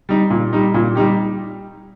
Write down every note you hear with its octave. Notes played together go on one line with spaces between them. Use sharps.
G3 D#4
A#2
G3 D#4
A#2
G3 D#4 G4